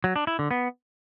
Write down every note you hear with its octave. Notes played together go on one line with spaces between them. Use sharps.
F#3
D4
E4
D3
B3